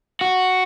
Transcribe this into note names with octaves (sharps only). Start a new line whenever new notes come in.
F#4